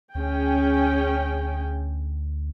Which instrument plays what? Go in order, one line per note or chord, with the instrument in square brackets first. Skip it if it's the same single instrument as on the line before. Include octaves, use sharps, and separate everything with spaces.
[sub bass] D2 [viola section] C#4 G#4 G5